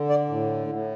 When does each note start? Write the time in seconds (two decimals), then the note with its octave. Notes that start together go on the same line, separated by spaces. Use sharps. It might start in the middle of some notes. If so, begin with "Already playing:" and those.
Already playing: D3
0.09 D5
0.29 A2
0.67 A2